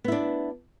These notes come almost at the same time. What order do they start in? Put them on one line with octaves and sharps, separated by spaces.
B3 E4 D4